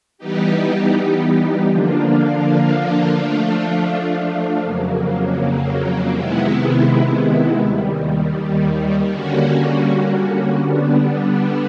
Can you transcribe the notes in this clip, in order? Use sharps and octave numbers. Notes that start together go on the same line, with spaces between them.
E3 G3 B3 D#4 G4
D3 F3 A#3 D4 F4
F3 A3 D4 F4
F2 C#3 F#3 A#3
C3 D#3 G#3 B3 E4
D#2 D#3 G3
D3 G3 A#3 C#4 F#4
D3 G3 B3 D4